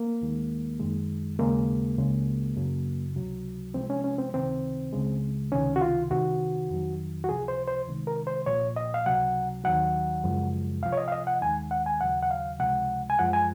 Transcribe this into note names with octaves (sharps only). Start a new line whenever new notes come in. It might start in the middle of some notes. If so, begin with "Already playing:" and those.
Already playing: A#3
D#2 D#3 G#3
F#2 D#3 G#3
D#2 C#3 G#3 A#3
C#2 C#3 G#3
F#2 C#3 F#3
C#2 C3 F#3
C2 C3 F3 G#3 C4
C#4
C#4
C4
C#2 C3 D#3 C4
C#2 C#3 G#3
C#2 C3 D#3 C#4
F#4
F4
C2 C3 D#3 F#4
F2 D#3 F#3
F#4
C#2 C3 F3 G#4
C5
C5
C2 C3 D#3 G#3
A#4
C5
C2 A#2 F3 C#5
D#5
F5
C#2 C3 F#3 F#5
D#2 D#3 F#3 F#5
F#2 C#3 F3 G#3
C2 C3 F3 F5
C#5
D#5
F5
D#5
F#5
D#2 D#3 G#3 G#5
F#5
G#5
D#2 C#3 F#3 F#5
F#5
F5
C#2 C3 F3 G#3 F#5
G#5
F#2 F3 G#3 F#5
G#5